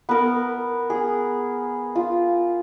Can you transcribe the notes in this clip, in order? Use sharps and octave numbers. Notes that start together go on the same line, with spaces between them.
B3 A#4
G#4
F4